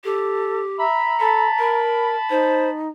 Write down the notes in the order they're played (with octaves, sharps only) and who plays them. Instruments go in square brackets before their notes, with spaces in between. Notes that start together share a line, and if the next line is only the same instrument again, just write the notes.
[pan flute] G4 [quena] A4
[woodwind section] E5 B5 [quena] A#5
[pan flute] A4 [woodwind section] A5 B5
[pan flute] A#4
[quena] D#4 [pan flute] C5